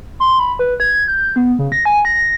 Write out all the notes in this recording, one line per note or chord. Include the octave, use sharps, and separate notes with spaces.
C6
B5
B4
G#6
G6
B3
C#3
A#6
G#5
A#6